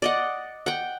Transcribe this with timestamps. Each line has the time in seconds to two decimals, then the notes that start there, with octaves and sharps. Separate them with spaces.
0.02 D5 D#5 F#5
0.66 F#5 G5